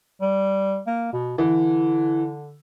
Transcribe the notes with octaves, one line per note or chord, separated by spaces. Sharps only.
G3
A#3
B2
D3 E3